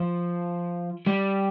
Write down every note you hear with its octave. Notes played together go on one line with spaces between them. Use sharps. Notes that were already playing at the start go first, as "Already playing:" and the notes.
Already playing: F3
G3